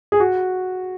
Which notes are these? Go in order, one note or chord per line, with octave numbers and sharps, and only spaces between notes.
G#4
F#4